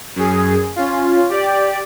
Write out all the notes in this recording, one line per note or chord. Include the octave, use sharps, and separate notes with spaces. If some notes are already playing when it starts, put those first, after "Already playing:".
F#2 G#4
C#4 F4
G4 D5